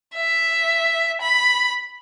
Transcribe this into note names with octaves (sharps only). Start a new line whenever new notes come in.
E5
B5